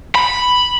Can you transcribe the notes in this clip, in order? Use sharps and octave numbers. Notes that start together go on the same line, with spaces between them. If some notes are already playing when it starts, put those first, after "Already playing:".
B5